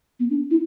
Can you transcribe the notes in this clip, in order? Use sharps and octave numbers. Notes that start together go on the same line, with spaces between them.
B3
D4
E4